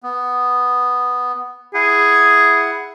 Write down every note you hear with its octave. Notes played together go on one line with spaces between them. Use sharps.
B3
E4 G#4 F#5